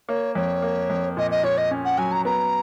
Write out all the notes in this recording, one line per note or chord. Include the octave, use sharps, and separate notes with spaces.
A#3 C#5
F2 C#5
A#3
F2
A#2 D#5
D#5
A#2 C#5
D#5
C#4
F#5
F#3 G#5
A#5
B3 A#5